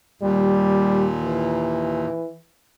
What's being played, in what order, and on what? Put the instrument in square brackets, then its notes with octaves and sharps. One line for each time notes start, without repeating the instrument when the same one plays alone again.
[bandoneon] D#2 A#2 [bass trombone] G3
[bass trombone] E3